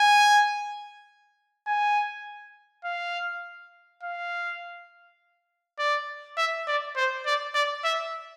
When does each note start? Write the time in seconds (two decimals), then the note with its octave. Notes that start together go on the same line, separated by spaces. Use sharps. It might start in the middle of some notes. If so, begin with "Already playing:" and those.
Already playing: G#5
1.67 G#5
2.84 F5
4.03 F5
5.79 D5
6.37 E5
6.67 D5
6.96 C5
7.26 D5
7.55 D5
7.84 E5